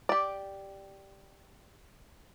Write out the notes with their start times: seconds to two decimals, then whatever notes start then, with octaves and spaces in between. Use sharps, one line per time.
0.09 G4 D5